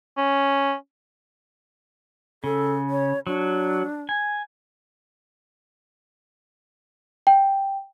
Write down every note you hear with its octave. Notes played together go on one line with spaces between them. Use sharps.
C#4
C#3 A4
C#5
F#3 D4
G#5
G5